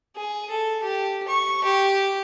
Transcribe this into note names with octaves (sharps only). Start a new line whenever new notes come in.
G#4
A4
G4
C#6
G4